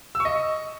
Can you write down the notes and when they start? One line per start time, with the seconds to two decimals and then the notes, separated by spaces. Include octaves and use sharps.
0.15 E6
0.20 C#6
0.25 D#5